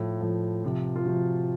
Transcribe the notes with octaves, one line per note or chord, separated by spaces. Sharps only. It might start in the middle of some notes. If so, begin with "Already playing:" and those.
Already playing: A2 F3 F4
A2 F3
C3 F3
F4
C3 F3 F#4